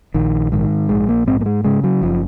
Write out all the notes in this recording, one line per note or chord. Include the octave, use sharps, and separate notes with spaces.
A#1 D#3
G#2 D#3
A#1 G#3
A#3
G#2 C4
A#3
G#3
C#3 G#3
F#3
F#1 F3